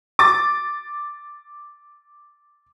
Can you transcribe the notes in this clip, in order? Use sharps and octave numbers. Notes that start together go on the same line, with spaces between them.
D6 A6